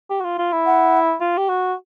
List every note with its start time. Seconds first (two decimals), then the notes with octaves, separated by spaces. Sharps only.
0.10 G4
0.20 F#4
0.24 F4
0.38 F4
0.52 E4
0.66 F#5
1.21 F4
1.38 G4
1.49 F#4